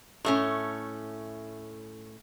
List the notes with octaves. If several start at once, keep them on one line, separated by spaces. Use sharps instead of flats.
A2 A3 C#4